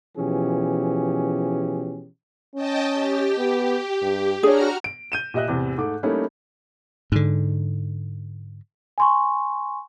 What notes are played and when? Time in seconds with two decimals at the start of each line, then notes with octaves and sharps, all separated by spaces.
0.17 B2 E3 F3 C#4 G4 G#4
2.55 C#4 D#5 G5 A5
2.93 G4
3.38 B3
4.02 G2
4.43 D4 F#4 G#4 C#5 A#5 F6
4.84 D7
5.12 G6 D#7 E7
5.34 A#2 G4 D#5 E5 F#6
5.48 E2 A2 C3 E3
5.77 G#2 A3 D6
6.03 G3 A3 A#3 C#4 D#4 E4
7.12 G#2 D3
8.98 G#5 C6 C#6